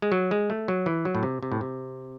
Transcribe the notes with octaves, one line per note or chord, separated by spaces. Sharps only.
G#3
F#3
G#3
A3
F#3
E3
F#3
A2
C3
C3
A2
C3